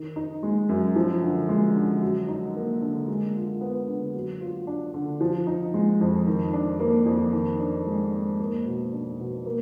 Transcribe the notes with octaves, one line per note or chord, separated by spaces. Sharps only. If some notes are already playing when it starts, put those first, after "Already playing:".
Already playing: D#3
D#4
G#3
F#2
F3
D3
G#3
D3
F#3
D#4
A#3
D3
G#3
F4
B3
D3
F#3
F4
D4
D3
F3
D#4
G#3
F2
D#3
D4
A#3
F2
D#3
D4
G#3
G#2
A#3
B2
D4
B2
A#3